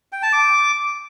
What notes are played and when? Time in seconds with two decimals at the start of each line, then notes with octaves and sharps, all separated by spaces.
0.12 G5
0.23 A5
0.33 D6